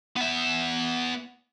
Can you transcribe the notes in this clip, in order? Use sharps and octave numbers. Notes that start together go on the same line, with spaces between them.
B3 E5